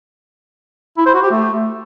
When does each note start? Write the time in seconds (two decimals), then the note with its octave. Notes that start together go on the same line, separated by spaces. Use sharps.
0.97 E4
1.06 C5
1.14 F#4
1.22 G4
1.31 A3